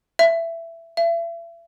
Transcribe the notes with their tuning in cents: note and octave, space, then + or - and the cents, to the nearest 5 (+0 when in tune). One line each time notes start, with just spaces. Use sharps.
E5 +15
E5 +40